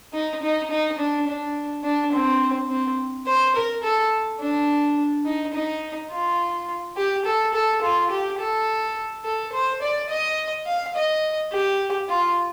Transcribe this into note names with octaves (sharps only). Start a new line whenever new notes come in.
D#4
D#4
D#4
D4
D4
D4
C4
C4
C5
A#4
A4
D4
D#4
D#4
F4
G4
A4
A4
F4
G4
A4
A4
C5
D5
D#5
F5
D#5
G4
F4